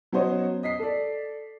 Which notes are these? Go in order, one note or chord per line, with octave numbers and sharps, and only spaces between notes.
F#3 B3 C#4 C5 C#5 D#5
D#5 B6 C7
A4 D5